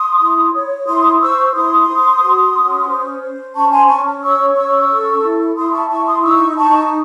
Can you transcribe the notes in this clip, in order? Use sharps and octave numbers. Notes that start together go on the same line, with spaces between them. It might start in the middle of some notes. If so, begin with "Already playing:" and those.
Already playing: C6 D#6
E4
C#5
E4 C6 D#6
C5 C#6 E6
E4 C6 D#6
C5
F#4
C#4
C5
C5
C#4 A5 C#6
G#5 C6
C#4 A5 C#6
C#5 C#6 E6
C#4 C#6 E6
A4
E4
E4 C6 D#6
A5 C#6
E4 A5 C#6
C6 D#6
D#4 C#6 E6
D#4 A5 C#6